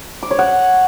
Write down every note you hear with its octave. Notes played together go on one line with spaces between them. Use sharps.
D6
C#5
F#5